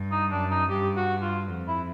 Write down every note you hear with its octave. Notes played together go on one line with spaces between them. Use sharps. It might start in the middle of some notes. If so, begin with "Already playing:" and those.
Already playing: G2
D#4
F#2 D4
D#4
G2 G4
F#4
F4
F2
E4